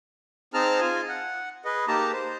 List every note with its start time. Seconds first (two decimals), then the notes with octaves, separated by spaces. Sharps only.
0.54 C4 D#4 G#4 A5 A#5 F6
0.81 F4 G#5
1.08 F#5
1.65 G#4 B4 D#5
1.88 A#3 D#4 G4 A5 A#5
2.13 C5